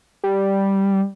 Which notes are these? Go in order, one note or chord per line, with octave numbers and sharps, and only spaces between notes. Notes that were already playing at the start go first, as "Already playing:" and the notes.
G3